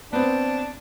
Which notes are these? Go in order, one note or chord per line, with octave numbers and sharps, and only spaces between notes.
B3 C4 D4